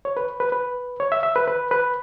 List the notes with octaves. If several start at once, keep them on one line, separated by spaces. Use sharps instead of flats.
C#5
B4
B4
B4
C#5
E5
E5
B4
B4
B4